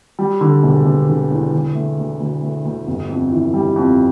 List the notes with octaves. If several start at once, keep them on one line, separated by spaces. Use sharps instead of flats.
G3
D3
E1
E1
D3
E2
D3
A3
D2
D2
A3
D2
G1
F2
E3
G3
F2